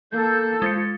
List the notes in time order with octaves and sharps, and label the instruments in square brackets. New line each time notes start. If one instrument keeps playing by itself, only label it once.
[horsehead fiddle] A#3 [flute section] A4 [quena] G6
[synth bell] G#3 A6 C#7 [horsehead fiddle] F4 [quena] C5